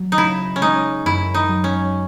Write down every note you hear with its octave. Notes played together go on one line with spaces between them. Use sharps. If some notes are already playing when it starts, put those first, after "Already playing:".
Already playing: F#3
D#4
C#3 E4
C#4
G#3 D#4
F#2 E4
D#4
F#3
C#4